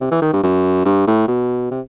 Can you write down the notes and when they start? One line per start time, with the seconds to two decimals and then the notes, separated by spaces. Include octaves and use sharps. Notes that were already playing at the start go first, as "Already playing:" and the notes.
0.01 C3
0.11 E3
0.22 D#3
0.33 G2
0.43 F#2
0.85 G2
1.07 A2
1.28 B2
1.71 C3